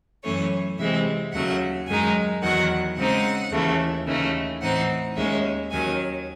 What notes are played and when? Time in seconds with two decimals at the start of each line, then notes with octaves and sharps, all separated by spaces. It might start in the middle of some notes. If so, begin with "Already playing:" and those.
0.23 F#2 E3 A3 C#4 C#5
0.78 C3 E3 G#3 C4 E5
1.33 D#2 C#3 F#3 A3 F#5
1.87 F#2 D#3 G#3 D#4 G#5
2.42 E2 D#3 F#3 F#5
2.97 C#3 G#3 C4 D#4 F#5
3.52 D#2 C#3 E3 A3
4.06 D#2 C#3 E3 A3 D#4
4.61 A2 E3 C4 D#4 F#5
5.16 D#2 D#3 G#3 C#4 E5
5.71 D#2 D#3 F#3 C#4 G#5